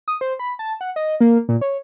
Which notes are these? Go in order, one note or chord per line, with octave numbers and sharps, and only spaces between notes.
D#6
C5
B5
A5
F#5
D#5
A#3
A#2
C#5